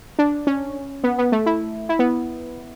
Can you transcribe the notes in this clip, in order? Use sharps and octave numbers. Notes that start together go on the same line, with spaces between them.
D4
C#4
B3
B3
A3
E4
E4
B3